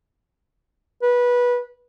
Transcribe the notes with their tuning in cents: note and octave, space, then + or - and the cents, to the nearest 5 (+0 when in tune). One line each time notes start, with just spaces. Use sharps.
B4 -20